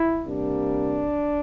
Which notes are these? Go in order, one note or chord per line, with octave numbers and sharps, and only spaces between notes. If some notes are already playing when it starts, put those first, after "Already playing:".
Already playing: E4
C3 G3 A#3 D4